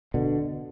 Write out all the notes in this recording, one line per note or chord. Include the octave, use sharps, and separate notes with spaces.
B2 D3